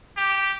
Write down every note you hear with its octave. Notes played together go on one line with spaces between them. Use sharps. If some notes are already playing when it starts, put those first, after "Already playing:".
G4